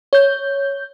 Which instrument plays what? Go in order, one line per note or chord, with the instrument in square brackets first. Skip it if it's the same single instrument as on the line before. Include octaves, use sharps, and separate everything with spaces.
[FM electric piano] C#5 G6